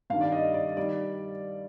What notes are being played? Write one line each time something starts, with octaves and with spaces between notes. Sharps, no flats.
G2 D#3 G3 F5
D5
D#5
D5
D#3 G3 D5